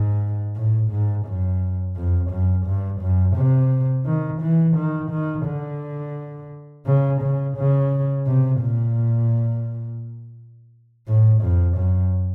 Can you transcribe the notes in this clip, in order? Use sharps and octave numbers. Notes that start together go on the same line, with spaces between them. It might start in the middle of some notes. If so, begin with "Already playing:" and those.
Already playing: G#2
A2
G#2
F#2
F2
F#2
G2
F#2
C3
D#3
E3
D#3
D#3
D3
C#3
C#3
C#3
C3
A#2
A2
F2
F#2